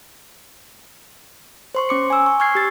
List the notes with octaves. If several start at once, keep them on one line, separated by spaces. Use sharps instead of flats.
C5 C6 C#6
C#4 D6 C#7
G#5 E6
C#6
C#6 F6 G#6 C7
G4 A6